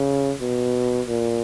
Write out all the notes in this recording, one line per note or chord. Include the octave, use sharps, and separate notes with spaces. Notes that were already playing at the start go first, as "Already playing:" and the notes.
Already playing: C#3
B2
A#2